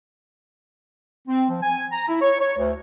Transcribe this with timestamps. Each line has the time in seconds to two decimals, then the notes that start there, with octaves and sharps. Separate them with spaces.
1.28 C4
1.50 F3
1.62 G#5
1.92 A#5
2.09 E4
2.22 C#5
2.41 C#5
2.58 D2